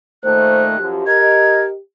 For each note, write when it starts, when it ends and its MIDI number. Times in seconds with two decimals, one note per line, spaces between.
0.24 0.76 46
0.24 0.76 51
0.24 0.76 57
0.24 0.64 72
0.24 0.86 90
0.78 1.06 42
0.78 1.06 53
0.78 1.79 67
1.07 1.68 70
1.07 1.68 75
1.07 1.62 92